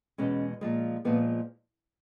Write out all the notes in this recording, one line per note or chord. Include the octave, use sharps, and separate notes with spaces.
E2 B2 G#3 C#4
A#2 F3 G#3
A#2 F3 G#3 B3